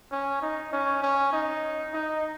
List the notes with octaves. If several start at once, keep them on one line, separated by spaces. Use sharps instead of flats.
C#4
D#4
C#4
C#4
D#4
D#4